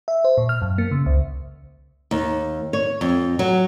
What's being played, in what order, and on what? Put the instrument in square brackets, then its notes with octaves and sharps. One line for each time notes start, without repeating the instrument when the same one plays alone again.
[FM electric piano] E5
C5
A#2
F6
F#2
A#3
C#3
C#2
[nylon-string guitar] D#2
C#5
F2
F#3